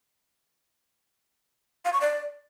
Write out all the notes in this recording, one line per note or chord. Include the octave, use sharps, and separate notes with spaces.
F5
C#6
D5